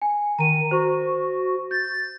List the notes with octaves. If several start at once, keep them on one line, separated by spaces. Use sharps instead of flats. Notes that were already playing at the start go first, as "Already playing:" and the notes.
G#5
D#3 A#5 D#7
F#4 C5 C#6
G6 A6